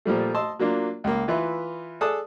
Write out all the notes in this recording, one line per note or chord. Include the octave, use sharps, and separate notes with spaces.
A#2 F3 G3 A3
D#5 A5 C6 E6
F#3 A#3 D4 F4
C#2 A#3
E3 F4 B4 E5
G#4 A4 D5 A5 D#6 F#6